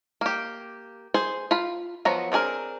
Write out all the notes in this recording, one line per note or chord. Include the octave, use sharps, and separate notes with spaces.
A#3 G4
G#4 C5
F4 B5
F3 F#3 B3 A#5
C4 D4 G#4 A#4